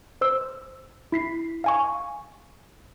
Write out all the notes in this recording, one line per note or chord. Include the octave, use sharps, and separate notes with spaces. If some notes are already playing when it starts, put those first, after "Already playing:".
C5 E6
E4 B6 C7
F5 G#5 C#6